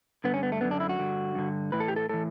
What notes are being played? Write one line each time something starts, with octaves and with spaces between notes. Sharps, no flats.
G2 D3 B3
C#4
B3
A3
F#2 D3 B3
D4
E4
F#4
G2 D3
G2 D3
A2 E3 B4
A4
G4
A4
A2 E3 A4